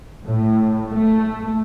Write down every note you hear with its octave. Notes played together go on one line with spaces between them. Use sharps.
A2
A3